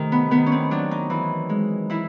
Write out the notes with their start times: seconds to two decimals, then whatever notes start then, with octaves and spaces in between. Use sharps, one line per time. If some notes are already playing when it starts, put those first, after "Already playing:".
Already playing: C3 D#3 A3
0.12 B3
0.31 D#3 B3
0.46 C#4
0.52 C4
0.71 F#3 D4
0.91 D#4
1.10 E3
1.49 G#3
1.90 E3 E4